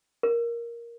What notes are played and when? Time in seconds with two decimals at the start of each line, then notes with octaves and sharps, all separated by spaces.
0.23 A#4